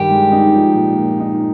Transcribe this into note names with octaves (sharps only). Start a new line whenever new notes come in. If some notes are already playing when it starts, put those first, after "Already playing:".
Already playing: G2 D#3 G4
G#3
D#4
F3
A#2
A#3
D#4